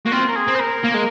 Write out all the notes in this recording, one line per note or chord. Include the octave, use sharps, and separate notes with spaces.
A#3 F#4
C4 F4
A#4
G#4
C4
C5
A#4
A#3
G#3